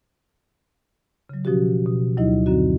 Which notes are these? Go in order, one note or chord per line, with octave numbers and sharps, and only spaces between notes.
C#3 F#3
B2 F3 C#4 F#4 G4
B2
D2 F#3 D#4 E4 D#5
F#2 D3 C4 F#4